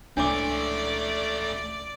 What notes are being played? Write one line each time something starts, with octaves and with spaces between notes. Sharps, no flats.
C#2 A3 C#4 D4 D5 D6